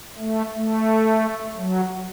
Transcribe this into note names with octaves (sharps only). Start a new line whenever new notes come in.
A3
A3
F#3